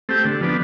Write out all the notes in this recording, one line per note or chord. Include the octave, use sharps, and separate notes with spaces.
A3 C4 G4
D3
F3 B3 D4